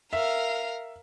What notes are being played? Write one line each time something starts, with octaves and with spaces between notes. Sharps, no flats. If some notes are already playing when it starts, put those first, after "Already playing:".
A#4 E5 F5